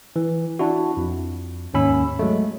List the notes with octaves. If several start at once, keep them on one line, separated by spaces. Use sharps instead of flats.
E3
D4 E4 F#4
F2
D#2 G#2 C#4 B5 E6
F#3 G#3 A3